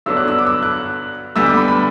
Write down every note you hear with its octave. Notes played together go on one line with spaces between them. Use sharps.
G2 D3 F#3 B3 D4 E6
F#6
E6
D6
E6
F#6
D2 D3 G3 B3 E6
D6
B5
B5